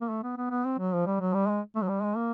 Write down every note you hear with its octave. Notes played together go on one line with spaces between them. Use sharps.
A#3
A3
B3
B3
B3
C4
F#3
F3
G3
F#3
G3
G#3
A3
F#3
G3
G#3
A#3